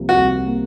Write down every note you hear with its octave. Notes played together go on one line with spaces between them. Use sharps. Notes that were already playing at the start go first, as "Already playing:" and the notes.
Already playing: C2 C3 F3 A#3
F#4
C2
A#3